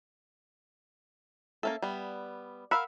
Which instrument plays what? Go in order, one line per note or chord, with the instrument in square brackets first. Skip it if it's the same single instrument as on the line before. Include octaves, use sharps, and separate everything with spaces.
[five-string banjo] A#3 C#4 A4 [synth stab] E5
[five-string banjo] G3 B3
[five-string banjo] A#4 F5 [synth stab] F#5 B5 E6